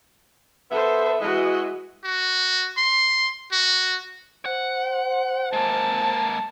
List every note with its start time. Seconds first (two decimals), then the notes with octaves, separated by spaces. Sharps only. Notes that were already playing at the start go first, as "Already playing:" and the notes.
0.71 B3 A4 C5 E5
1.21 E3 G#3 F#4 D#5
2.04 F#4
2.78 C6
3.52 F#4
4.46 C5 F#5
5.53 G#3 A#3 A5